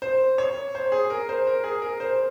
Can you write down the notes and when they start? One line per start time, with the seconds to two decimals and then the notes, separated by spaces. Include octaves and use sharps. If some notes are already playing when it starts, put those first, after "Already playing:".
0.02 C5
0.38 C#5
0.75 C5
0.92 G#4
1.10 A#4
1.29 C5
1.47 A#4
1.64 G#4
1.82 A#4
2.00 C5